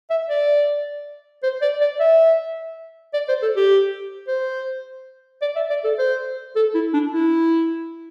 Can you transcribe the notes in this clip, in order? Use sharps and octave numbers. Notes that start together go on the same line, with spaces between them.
E5
D5
C5
D5
D5
E5
D5
C5
A4
G4
C5
D5
E5
D5
A4
C5
A4
E4
D4
E4